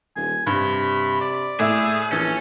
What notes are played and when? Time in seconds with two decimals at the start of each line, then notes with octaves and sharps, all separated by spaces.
0.16 D#1 G#5
0.47 G2 C3 B5
1.21 D5
1.59 A2 G#4 E5
2.11 A#1 E3 C#4 A4